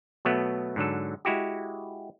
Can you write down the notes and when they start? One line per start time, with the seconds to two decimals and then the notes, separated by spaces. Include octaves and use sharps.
0.25 B2 F#3 A3 B3
0.76 G#2 D3 F#3 A4
1.25 G#3 E4 F#4 G4